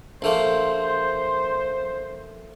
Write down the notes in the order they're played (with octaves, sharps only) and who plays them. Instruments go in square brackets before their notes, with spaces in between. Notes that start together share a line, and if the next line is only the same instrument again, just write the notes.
[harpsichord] A#1 A3 A#3 [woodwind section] C5